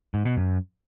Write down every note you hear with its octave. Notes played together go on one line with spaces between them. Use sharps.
G#2
B2
F#2